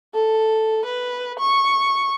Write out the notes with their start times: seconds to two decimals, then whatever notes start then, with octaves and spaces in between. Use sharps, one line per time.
0.15 A4
0.85 B4
1.39 C#6